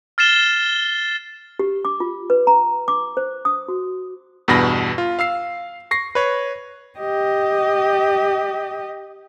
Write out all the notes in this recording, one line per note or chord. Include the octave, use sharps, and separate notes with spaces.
F6 A6 C7 E7 G7
G4
D6
F4
B4
A#5
D6
C5
D#6
F#4
E2 G2 B2 B5 A#6
F4
F5 E6 C7
C#6 A#6 C7
B4 C#5
G4 D#5